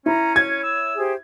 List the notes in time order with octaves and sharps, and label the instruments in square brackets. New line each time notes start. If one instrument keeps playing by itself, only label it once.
[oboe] C#4 [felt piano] E4 [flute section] A#5
[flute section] C#5 [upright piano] G#6
[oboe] E6
[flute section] G4 G#4 C5